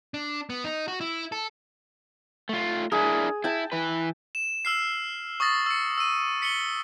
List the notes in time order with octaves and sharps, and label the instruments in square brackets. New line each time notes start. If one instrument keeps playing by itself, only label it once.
[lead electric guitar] D4
B3
D#4
F#4
E4
A4
[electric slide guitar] A3 F4
[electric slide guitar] D4 E4 A#4 [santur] G#4
[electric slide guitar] E4 [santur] G5 A5
[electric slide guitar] E3 B4
[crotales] E7
E6 F6 C7
C#6 D#6 E6 A6 A#6
E6 C#7
E6 D#7
B6 C#7 F#7 G7